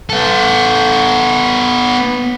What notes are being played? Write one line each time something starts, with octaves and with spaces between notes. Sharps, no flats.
B3 A4